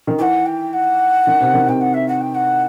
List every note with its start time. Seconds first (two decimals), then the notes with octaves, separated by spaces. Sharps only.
0.07 D#3
0.19 E3 F#5 G5
0.46 G5
0.73 F#5
1.27 D#3
1.40 C3
1.54 D#3
1.68 C3 G5
1.81 F#5
1.94 E5
2.08 F#5
2.21 G5
2.35 F#5